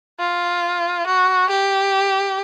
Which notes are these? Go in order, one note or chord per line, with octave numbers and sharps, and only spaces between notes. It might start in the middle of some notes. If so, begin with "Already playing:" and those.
F4
F#4
G4